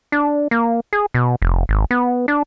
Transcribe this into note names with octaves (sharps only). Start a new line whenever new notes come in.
D4
A#3
G#4
B2
F1
G#1
B3
D4